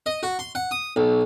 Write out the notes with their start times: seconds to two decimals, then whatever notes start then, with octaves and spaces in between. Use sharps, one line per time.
0.06 D#5
0.23 F#4
0.39 C6
0.55 F#5
0.71 D#6
0.96 B1